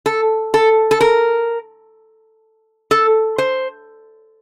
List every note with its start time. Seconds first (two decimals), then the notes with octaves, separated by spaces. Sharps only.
0.06 A4
0.54 A4
0.91 A4
1.01 A#4
2.91 A4
3.38 C5